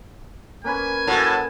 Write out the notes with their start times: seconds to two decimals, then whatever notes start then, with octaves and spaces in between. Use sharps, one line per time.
0.64 A#3 C#4 B4 G#5
1.07 A2 F#3 F#4 A5